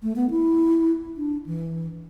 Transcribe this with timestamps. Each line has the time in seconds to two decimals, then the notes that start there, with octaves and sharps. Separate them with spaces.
0.03 A3
0.16 B3
0.30 E4
1.17 D4
1.46 E3